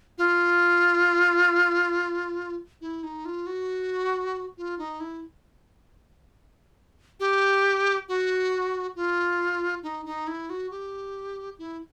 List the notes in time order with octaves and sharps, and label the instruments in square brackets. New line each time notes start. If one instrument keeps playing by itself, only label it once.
[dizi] F4
E4
D#4
F4
F#4
F4
D#4
E4
G4
F#4
F4
D#4
D#4
E4
F#4
G4
E4